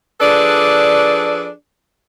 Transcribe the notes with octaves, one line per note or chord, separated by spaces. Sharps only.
F3 D4 G#4 A4 B4 D5